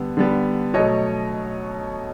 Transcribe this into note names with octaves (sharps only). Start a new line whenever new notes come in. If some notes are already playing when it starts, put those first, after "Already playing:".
Already playing: D3 G3 B3
D3 G3 B3
B2 F#3 A3 C#5 D#5